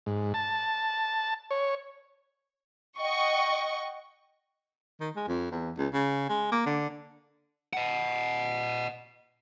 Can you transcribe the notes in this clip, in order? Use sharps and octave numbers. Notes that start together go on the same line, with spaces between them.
G#2
A5
C#5
D#5 F#5 G5 C#6
D#3
G#3
F2
E2
C#2
C#3
G#3
A#3
D3
D#5 F#5